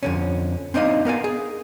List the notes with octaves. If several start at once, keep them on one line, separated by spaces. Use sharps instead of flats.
F2 D3 C#4
C4 D4 D#4 D#5 F5
B3 A#4 F5 G#5
G#4